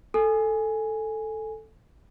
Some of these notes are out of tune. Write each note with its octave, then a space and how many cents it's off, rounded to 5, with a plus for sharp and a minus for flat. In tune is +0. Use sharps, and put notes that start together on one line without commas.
A4 +0 G#5 +0